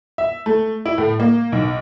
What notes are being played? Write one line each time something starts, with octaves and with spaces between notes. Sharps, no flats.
E5
A3
E4
A2
A#3
B1